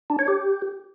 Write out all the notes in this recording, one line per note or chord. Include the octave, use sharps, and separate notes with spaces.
D4
C#5
G4